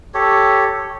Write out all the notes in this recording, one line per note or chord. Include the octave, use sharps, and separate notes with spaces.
G4 A4 C#5